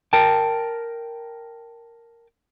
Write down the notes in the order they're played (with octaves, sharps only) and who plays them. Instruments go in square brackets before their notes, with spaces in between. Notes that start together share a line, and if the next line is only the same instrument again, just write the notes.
[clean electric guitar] A#4 G5 A5